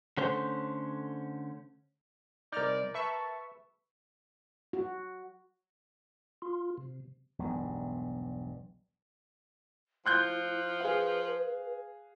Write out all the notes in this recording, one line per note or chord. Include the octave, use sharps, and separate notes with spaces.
D3 A3 C#4 C5
C2 D#4 A#4 D5 F6 G6
B4 E5 A5 C#6
F#4
F4
C3
E1 B1 G2
F3 E4 C6 F#6 G6
G#4 B4 F5